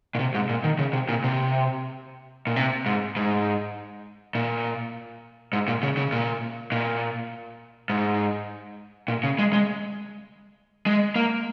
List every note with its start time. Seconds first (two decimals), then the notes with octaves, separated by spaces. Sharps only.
0.15 A#2
0.19 C3
0.34 G#2
0.49 A#2
0.64 D#3
0.79 C#3
0.93 C3
1.09 A#2
1.24 C3
2.47 A#2
2.56 C3
2.86 G#2
3.16 G#2
4.35 A#2
5.53 G#2
5.68 A#2
5.83 C#3
5.97 C#3
6.12 A#2
6.72 A#2
7.90 G#2
9.08 A#2
9.24 C#3
9.39 G#3
9.53 G#3
10.86 G#3
11.16 A#3